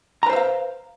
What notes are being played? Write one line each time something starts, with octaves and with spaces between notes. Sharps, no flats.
B4 C5 E5 F5 A#5